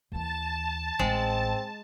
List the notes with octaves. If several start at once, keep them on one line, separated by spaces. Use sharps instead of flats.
D#2 E3 A5
A1 A2 G#3 C4